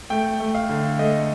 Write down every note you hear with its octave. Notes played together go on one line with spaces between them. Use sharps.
A3 G5
A3
F5
D3
A3 D#5